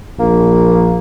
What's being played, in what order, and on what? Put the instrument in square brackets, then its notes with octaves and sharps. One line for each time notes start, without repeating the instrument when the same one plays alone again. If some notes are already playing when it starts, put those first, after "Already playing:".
[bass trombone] A#1 [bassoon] A#3